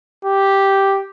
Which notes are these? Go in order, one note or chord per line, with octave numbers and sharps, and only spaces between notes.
G4